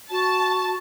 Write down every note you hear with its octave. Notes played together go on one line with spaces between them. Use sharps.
F#4 A5